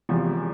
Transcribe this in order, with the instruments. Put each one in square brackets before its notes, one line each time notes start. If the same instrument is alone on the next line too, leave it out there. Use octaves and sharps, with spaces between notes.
[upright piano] E1 E2 C3 F3